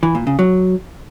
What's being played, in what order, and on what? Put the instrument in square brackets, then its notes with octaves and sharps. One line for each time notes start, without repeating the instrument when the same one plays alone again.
[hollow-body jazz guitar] E3
A#2
C#3
F#3